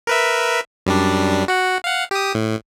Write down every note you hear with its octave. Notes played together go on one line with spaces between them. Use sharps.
A#4 B4 E5
F#2 G3 D4
F#4 F#5
F5 F#5
G4 D#6
A2